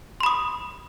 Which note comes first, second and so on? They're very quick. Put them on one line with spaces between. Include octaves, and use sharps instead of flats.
C6 B5 D#6